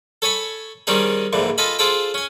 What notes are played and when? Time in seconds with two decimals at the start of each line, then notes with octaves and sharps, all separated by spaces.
0.22 A4 C#5 G#5 B5
0.87 D#3 G3 C4 C#4 D#4 G#4
1.33 A#1 G#2 D3 E3
1.58 F4 A4 D#5 G#5 B5
1.79 F4 G#4 A4 C5 G5
2.14 C#4 G#5